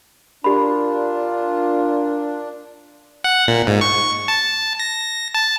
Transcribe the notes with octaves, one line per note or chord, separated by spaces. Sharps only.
A#2 D4 F4 G4 B5
F#5
A#2
G#2
C#6
A5
A#6
A5